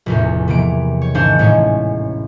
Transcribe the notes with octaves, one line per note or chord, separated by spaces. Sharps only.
F1 E2 A2
C3 E3 A#3 D7
C#5
G#1 C#4 D4 C5 F5 G#6
A1 A2 G#3 C#5